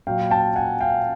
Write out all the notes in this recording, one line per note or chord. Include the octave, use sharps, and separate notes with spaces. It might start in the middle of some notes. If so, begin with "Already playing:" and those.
A#2 F#3 F5 G5
G5 A5
F#5 G#5
F5 G5